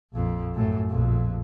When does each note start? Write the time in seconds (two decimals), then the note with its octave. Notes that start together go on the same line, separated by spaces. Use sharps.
0.12 A#1 F2
0.53 F#2 A2
0.89 A#1 F2